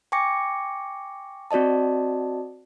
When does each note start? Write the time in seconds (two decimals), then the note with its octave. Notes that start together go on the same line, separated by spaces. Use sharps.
0.12 G5 G#5 C#6 D6 A#6 C#7
1.51 C4 F#4 D5 D#5 A5